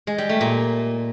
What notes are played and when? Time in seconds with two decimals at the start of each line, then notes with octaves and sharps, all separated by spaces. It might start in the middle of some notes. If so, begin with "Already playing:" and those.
0.07 G#3
0.18 G3
0.29 A3
0.41 A#2